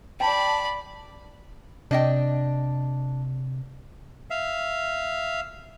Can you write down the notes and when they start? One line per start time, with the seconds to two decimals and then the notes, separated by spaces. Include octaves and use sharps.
0.20 D5 G5 A5 B5
1.91 C3 D4 D#5 G5
4.30 E5 F5